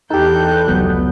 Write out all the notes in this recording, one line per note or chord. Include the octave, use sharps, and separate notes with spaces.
E2 D#4 G4 A4 F#6 G6
F1 C#2 F#3 B3